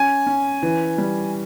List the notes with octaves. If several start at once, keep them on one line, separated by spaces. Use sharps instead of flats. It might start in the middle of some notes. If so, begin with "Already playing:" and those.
Already playing: C#4 G#5
C#4
E3
G3